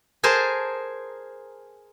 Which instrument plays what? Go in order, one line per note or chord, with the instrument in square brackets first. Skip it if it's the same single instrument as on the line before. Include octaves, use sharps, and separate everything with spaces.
[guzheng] G#4 A#4 C5 G#5 A5